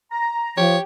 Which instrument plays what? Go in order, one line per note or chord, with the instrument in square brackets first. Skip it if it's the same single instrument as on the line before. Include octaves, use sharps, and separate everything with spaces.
[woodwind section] A#5
[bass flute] F3 [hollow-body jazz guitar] G4 [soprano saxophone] C#5